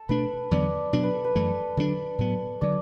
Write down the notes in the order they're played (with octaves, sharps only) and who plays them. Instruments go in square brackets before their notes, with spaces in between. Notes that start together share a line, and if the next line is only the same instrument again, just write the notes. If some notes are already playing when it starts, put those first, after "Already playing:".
Already playing: [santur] A4
[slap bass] B2 A3 D4 [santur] B4
[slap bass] E2 D3 F#3 B3 [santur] D5
[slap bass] B2 F#3 D4
[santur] B4
A4
B4
[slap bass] F#2 E3 A3 [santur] A4
[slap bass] D3 F#3 A3 D4 [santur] A4
[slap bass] A2 F#3 B3
[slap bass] D3 F#3 [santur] D5